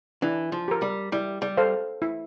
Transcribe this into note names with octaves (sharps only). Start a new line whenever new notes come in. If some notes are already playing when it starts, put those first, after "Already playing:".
E3 D4
F3
G4 A#4
G3
G3 E4
G3
A4 C5 F5
E4